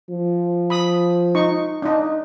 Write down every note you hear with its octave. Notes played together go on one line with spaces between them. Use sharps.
F3
B5 D#6
D#4 C#6
D4 D#4